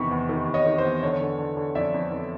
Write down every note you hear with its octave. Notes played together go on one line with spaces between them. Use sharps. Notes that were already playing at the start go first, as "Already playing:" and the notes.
Already playing: E2 C3 D#3 B5 C#6
E2
D#3
E2
C#5 D#5
D#3
C5
E2
D3 C#5
D3
D3
D3
F2 D5 E5
F2
F2